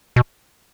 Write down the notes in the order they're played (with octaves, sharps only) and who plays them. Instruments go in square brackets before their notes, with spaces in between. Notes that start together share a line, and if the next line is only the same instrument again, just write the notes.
[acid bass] B2